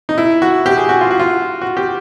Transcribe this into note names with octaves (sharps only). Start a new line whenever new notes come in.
D#4
E4
F#4
G4
G#4
F#4
F4
F#4
F4
F#4
G4